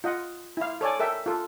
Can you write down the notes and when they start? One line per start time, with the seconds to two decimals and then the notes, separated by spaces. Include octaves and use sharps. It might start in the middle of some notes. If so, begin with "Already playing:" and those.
0.04 F4 D#5 F#5
0.57 E4 F5
0.81 A4 C#5 D5 G#5
1.00 A4 A#4 E5 G5
1.26 F4 A4